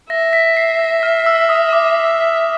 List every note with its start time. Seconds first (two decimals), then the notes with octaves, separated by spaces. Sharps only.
0.10 E5 A#6
0.33 B6
0.57 C7
0.79 A#6
1.03 F6
1.26 E6
1.49 D#6
1.73 D6